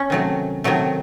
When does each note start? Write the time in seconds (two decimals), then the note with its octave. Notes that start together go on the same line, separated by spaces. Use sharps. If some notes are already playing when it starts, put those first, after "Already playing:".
Already playing: C#4
0.10 C3 D#3 F#3 A3
0.64 C3 D#3 F#3 A3